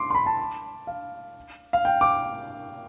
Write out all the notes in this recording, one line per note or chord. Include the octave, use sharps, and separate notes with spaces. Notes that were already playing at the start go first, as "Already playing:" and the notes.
Already playing: C6 D6
C6
B5
A5
F5
F5
G5
D6